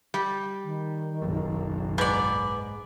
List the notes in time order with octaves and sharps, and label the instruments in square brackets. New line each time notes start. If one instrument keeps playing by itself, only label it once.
[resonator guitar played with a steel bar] G3
[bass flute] D#3
[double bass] F#1 B1
[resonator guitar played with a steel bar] G#2 [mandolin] B3 D5